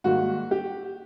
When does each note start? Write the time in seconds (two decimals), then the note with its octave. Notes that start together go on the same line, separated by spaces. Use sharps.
0.04 G#2 D#3 G3 A#3 F#4
0.51 G4